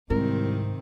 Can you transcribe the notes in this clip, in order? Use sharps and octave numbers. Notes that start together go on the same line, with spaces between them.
C2 G#2 C3 D#3 C4 A#4